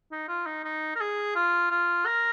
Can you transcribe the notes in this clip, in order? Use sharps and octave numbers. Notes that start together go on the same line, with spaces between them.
D#4
F4
D#4
D#4
A#4
G#4
F4
F4
A#4